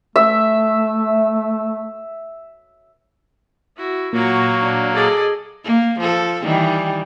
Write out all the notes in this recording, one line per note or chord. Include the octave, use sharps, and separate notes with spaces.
A3 E5
E4 F#4
A#2 F#3 A#3 F#4 C#6
D4
G#4 A4 D5 D#5
A#3
F3 A4
D#3 E3 G3